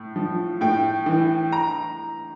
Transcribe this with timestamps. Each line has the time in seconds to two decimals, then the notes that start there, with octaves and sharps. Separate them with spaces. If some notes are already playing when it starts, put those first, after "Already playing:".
Already playing: A2
0.16 F3
0.61 A2 G5
1.06 E3
1.52 A#5